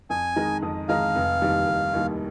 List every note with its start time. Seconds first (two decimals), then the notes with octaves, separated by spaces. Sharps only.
0.10 F2 G#5
0.36 D#3 G#3 D#4 A#4
0.62 F2
0.88 D#3 G#3 D#4 A#4 F5
1.16 F1
1.41 D#2 D#3 G3
1.68 F1
1.93 D#2 D#3 G3